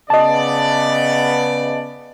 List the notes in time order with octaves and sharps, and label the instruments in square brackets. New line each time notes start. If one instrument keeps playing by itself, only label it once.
[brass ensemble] C#3 B3 D5 [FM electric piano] D#5 A5